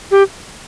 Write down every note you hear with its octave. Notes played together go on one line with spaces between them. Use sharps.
G4